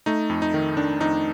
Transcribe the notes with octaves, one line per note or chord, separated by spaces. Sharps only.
A3 D#4
F2
D#4
D#3
D#3 D4
F2 D#4